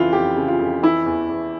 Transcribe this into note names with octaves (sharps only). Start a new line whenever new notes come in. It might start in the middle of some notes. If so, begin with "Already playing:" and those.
Already playing: F2 C#3 E3 E4 F4
F2 G4
C#3
F4
F2
E3 E4
E2
E2